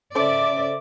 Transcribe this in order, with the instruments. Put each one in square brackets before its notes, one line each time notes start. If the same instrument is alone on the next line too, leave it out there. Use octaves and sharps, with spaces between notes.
[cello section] C#3 D5 [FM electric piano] C#4 A4 C5 [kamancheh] E5 D6